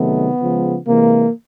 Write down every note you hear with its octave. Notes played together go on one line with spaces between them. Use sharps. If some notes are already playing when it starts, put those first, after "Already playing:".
Already playing: C3 D#3 F#3 A3 B3
C#3 F3 G#3
C3 E3 G#3 A#3